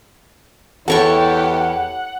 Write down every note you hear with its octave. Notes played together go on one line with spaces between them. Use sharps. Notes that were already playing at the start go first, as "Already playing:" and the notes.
E2 E4 G4 A4 C#5 F#5 C#6